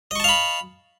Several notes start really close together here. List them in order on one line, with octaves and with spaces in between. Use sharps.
D#5 C#6 A5 F5 B5